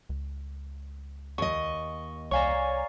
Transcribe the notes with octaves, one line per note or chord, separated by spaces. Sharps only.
C#2
D#2 D#5 C#6
C2 C#5 D5 F5 G#5 A#5 C#6